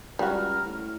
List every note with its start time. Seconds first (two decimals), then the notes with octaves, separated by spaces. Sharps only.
0.19 C#2 G3 F#4 A#5 F6
0.65 A2